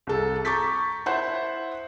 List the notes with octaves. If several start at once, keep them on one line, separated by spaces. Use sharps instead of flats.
C2 A4
A#5 C#6 D6 G6 A6 B6
E4 C5 E5 F#5